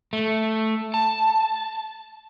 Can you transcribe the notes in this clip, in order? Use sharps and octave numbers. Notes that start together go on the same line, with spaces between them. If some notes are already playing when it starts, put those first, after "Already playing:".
A3
A5